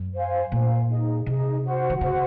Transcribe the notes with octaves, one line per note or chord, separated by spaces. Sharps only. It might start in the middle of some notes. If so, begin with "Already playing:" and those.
Already playing: F#2
C5 F5 G#5
A#2 C5 F5 G#5
D#4 G#4 D#5
C3 D#4 G#4 D#5
F#4 C5 F#5
D#3
C#3 F#4 C5 F#5